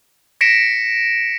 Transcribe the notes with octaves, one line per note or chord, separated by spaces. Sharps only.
A#6 B6 C#7 D7 E7